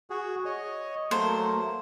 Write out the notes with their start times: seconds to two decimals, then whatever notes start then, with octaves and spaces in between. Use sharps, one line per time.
0.10 F#4 G#4
0.45 C#5 D#5
1.11 F#3 A3 A#3 C5